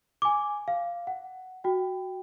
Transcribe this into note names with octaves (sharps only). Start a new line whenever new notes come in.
G#5 D6
F5
F#5
F#4 G5